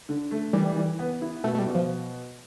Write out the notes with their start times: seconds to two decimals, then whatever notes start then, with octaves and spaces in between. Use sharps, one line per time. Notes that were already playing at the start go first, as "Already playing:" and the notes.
0.09 D3
0.31 A3
0.53 E3 G3
0.76 E3
0.99 B3
1.22 E4
1.44 B2 A3
1.55 A3
1.59 G3
1.67 B2
1.75 F3